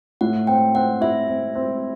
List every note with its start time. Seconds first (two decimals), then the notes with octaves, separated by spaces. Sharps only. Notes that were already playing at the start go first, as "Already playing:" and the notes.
0.21 A2 F#5
0.47 C4 G5
0.75 C4 F#5
1.01 E4 E5
1.28 C4
1.55 C4